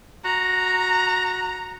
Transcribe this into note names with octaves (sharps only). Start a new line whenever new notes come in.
F#4 A#5